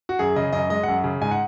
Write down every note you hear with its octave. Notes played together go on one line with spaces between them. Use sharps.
F#4
F#2 G#4
C#3 D#5
F#2 D#5
G#3 D#5
F#2 F#5
C#3
G#2 G#5
F#5